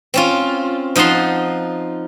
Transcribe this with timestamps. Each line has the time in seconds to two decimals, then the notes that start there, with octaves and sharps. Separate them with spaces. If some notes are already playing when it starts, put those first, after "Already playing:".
0.14 C4 C#4 F4
0.96 F3 D#4 F#5 A5 C6